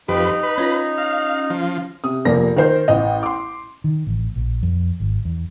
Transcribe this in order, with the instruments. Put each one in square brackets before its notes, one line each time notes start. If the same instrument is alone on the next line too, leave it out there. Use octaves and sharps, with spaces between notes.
[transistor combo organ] F2 B4 [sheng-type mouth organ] D#4 [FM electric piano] G4
[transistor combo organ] B4
[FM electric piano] C#4 F4 A#6
[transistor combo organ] F5
F3
[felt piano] C3 D#6
F1 F3 A#3 D5 A#6
D#3 A#4 C5 G6
A1 D#5
C6 D6
[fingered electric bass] D#3
A1
A#1
F2
G#1
E2